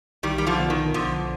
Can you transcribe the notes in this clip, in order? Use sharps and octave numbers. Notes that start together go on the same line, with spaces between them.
B1 D#3 G3
G3
D3 F3
B2 B3
D#3
B1 D3 F3